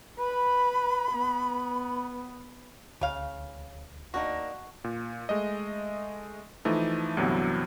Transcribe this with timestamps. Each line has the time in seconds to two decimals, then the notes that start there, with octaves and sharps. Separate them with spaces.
0.19 B4 B5
1.12 B3
3.01 D2 C#3 F5
4.14 A#3 D4 D#4 F#4
4.84 A#2
5.29 G#3 A3 D#5
6.65 E3 F3 A3 D#4
7.17 D2 G2 C3 E3 F#3 B3